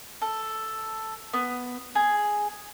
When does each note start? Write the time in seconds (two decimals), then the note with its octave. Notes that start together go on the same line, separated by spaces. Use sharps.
0.22 A4
1.33 B3
1.95 G#4